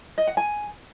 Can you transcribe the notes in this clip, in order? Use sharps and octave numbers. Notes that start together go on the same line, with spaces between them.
D#5
F#5
G#5